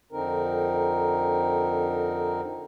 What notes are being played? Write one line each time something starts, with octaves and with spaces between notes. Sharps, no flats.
F2 D3 C4 D#4 A#4